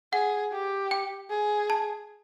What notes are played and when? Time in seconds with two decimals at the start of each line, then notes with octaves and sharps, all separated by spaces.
0.13 G#4 F#5
0.52 G4
0.91 G5
1.30 G#4
1.70 A5